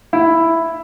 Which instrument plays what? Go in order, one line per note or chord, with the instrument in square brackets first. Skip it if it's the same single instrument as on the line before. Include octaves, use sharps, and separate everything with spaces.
[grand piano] E4